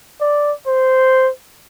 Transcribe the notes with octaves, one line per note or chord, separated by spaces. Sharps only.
D5
C5